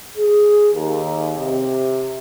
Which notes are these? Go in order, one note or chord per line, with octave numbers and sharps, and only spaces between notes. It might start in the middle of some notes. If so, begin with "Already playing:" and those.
G#4
D#2
C3